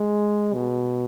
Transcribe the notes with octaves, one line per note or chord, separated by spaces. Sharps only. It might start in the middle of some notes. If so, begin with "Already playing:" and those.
Already playing: G#3
B2